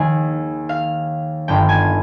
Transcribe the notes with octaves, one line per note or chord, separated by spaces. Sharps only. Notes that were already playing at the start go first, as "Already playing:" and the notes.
Already playing: D#2 D#3 G#4
F5
G1 G2 D#3 G5
G#5